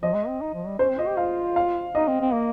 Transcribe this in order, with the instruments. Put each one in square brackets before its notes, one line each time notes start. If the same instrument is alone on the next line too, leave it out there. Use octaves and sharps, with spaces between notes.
[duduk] F3 [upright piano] D#5
[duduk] G#3
C4
D#4
F3
G3
[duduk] C#4 [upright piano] C5
[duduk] C4
[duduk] F4 [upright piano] D#5
[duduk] G4
[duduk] F4 [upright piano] F5
[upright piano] F5
[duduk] D#4 [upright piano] D#5
[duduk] C4
C4
A#3